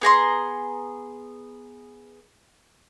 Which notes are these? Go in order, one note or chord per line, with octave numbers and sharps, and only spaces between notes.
B3 G#4 A#5 C6